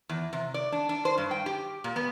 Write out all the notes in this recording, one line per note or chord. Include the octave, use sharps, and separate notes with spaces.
E2
C3
D5
D4
D4
C5
G2
G5
G4
A#2
B3